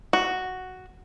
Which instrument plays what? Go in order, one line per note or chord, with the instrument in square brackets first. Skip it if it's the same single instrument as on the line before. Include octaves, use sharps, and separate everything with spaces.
[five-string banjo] F#4